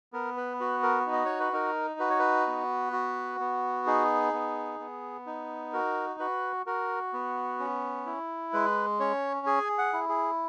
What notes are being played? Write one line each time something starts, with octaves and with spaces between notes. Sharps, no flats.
B3 A#4
B4
F#4 B4
A#4
D#4
D#5
C#5
B4
D#4 A#4
F#4 B4
C#5
B4
B3
F#4
B3
D#4 G#4
B3
B3
D#4
F#4 A#4
F#4 B4
F#4 A#4
B3
C#4
E4
G#3 B4
C#4 C#5
G#4 G#5
F#5
E4
G#4